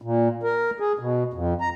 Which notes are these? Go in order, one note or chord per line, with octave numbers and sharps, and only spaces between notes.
A#2
A#4
G#4
B2
F2
A#5